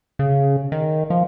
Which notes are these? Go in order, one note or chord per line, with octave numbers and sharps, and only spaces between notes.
C#3
D#3
F3